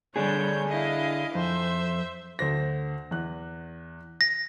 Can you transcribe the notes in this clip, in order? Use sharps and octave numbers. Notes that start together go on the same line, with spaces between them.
D3 G3 D4 G#4 C#5 G6
E4 D#5 F5
F2 C5 E5
D2 C5 A#6
E2 F#6
A#6